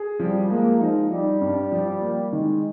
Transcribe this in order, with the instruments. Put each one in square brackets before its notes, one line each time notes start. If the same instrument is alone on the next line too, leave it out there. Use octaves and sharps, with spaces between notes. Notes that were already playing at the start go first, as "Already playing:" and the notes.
Already playing: [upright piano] G#4
[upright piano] F3 [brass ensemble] G3
[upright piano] G#3 [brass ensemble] A#3
[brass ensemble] F3 [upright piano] D#4
[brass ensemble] G3 [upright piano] D#4
[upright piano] G2
F3
A#3
[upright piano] D#3 [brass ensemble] G#3